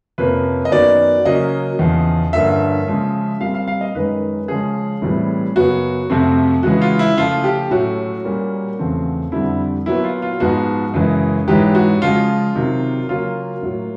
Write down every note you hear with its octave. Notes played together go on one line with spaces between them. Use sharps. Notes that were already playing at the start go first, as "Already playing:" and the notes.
F2 C3 F3 A#3 C#4 B4
D#5
F#2 D#3 F#3 B3 D5
C#3 F#3 A#3 C#4 D#5
E2 C#3 F3
G2 D3 F3 A#3 C#4 E5
C#3 F3 G#3 C#4
A#2 G3 C4 F5
F5
F5
D#5
F#2 D#3 G#3 C#4 B4
C#3 F3 G#3 C#4 G#4
A2 E3 G3 C4
F#2 C#3 F#3 B3 F#4
F2 C3 F3 A3 C4
C#3 E3 G#3 F#4
F4
E4
C#3 F3 A3 F4
G4
A2 F#3 A3 C#4 F#4
A#2 G3 A#3 C#4
E2 C#3 F3 A3 C4
F2 D3 G3 C4 E4
A#2 F#3 B3 E4
F4
F4
G#2 F3 G#3 B3 F#4
F#2 C#3 E3 G#3
G#2 E3 G#3 C#4 G4
F#4
C#3 F3 G#3 F4
C3 D#3 F#3
C#3 F#3 A#3 C#4 F4
A2 F#3 A#3